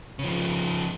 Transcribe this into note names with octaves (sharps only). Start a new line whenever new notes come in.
C#3 F3